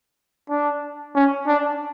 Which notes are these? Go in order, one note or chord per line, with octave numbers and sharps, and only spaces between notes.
D4
C#4
D4